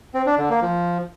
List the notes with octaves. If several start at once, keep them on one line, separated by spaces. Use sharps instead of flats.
C4
D4
D3
A#3
F3